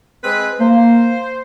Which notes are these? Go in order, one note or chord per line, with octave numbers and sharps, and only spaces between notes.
G#3 C4 B4
A#3 C5